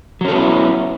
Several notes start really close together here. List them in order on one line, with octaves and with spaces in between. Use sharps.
F#3 C#4 A4 B3 E4